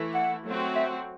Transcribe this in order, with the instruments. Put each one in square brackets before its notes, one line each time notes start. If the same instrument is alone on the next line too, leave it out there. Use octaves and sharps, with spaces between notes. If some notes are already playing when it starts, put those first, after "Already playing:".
Already playing: [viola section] E3 A3 E4
[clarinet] F#5
[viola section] F#3 A3 C4 F#4
[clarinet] E5